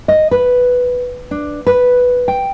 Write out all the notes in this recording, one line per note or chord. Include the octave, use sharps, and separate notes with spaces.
D#5
B4
D4
B4
G5